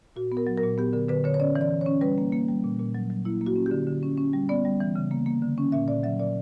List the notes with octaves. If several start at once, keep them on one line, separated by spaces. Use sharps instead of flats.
A#2 F#4
B3
A#4
F#3
A#4
A#2
B3 G4
D3 A#4
D3 B4
D3 C#5
C#5
C#4 D5
E3
D5
E3
C#4 C#5
G3 B4
A#3
A#3
G3
A#2
A#2
F#3
F#3
A#3 E4
A#3
F#4
C#4
G4
D3
D3
C#4
C#4
G3
B3 D5
G3
E3
C#3
A#3
A#3
D3
C#4
A#2 E5
A#2 D5
F#3 E5
A#2 D5